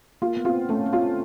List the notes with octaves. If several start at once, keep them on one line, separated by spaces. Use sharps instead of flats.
A#3 F4
B3
C4 F4
A3 C#4
C#4
C4 F4